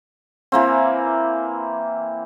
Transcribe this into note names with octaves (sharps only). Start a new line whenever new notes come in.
E3 A#3 C4